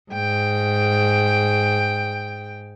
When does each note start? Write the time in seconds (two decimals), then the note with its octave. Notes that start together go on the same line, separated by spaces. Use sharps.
0.12 G#2 G5